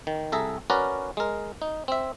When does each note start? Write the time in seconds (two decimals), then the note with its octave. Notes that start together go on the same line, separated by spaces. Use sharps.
0.07 D#3
0.32 C2 G#4 A4 E5 A#5
0.70 C#4 F#4 A#4 B4 D5 A#5
1.17 G#3 A#4
1.62 D#4
1.88 C4 E5